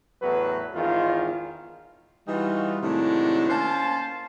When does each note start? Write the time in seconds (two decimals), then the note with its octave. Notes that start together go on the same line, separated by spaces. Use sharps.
0.22 E2 A2 F#3 B3 B4
0.75 G#1 E2 D#3 F4
2.28 E3 G3 D#4 F4 F#4
2.83 A2 C3 D#3 F#3 G#3 D4
3.50 A#3 C#4 C5 A5